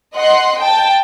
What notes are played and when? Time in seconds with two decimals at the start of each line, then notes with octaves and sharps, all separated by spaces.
0.15 D#5 F#5 C6
0.61 G5 A5